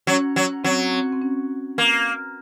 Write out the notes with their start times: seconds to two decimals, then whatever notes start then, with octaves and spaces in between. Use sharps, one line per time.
0.07 F#3 C#4
0.36 F#3
0.64 F#3 C4
0.93 C4
1.12 C4
1.22 C#4
1.78 A#3